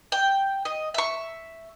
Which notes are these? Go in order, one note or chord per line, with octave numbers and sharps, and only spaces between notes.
G5
D#5
E5 C#6